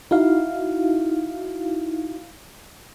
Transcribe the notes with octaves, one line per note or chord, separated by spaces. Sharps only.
D#4 E4 F#4 F5